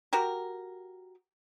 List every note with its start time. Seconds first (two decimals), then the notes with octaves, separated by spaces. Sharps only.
0.13 F#4 G4 A#4